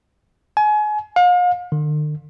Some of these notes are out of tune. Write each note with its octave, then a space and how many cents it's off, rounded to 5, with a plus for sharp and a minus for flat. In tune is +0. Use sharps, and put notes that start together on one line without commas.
G#5 +30
F5 +40
D3 +45